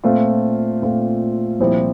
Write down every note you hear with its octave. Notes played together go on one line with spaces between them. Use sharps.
A#2 A3 C4 F4
A#2 A3 C4 F4
C2 A#2 F3 C4 E4